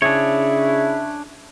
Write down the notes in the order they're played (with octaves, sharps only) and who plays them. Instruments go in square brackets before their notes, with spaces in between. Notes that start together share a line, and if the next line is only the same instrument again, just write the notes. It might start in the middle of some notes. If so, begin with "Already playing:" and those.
[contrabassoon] C#3 [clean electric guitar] D4 G#4 C#5 [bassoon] E4